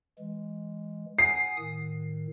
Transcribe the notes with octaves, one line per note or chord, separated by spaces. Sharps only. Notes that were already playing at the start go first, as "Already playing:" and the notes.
E3 G#3
F#5 G#5 D#6 C7
A2 D#3